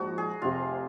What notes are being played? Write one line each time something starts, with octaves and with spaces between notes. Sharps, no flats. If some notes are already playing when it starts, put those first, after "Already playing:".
Already playing: A#1 G#2 F3 D#4 F#4
G#4
F1 F2 C3 F4